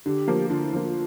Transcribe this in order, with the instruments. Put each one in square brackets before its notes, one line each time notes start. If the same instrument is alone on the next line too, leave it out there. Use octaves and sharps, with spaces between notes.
[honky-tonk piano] D3 [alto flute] G4
[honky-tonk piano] F3 A#3
[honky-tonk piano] D3 [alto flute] F4
[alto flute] E4
[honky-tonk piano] F3 A#3 [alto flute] F4